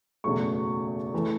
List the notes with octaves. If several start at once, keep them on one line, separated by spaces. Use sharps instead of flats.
F#1 E2 B2 F#3 A3 C#6
E3 A3